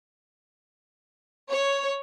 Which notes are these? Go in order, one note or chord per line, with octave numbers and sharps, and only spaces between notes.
C#5